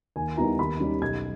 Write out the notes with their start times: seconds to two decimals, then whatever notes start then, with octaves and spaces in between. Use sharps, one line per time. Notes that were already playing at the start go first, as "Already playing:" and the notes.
0.16 D#2 G#5
0.37 D#3 G3 B3 E4 A#5
0.58 D#2 B5
0.80 D#3 G3 C#4
1.02 B1 G#6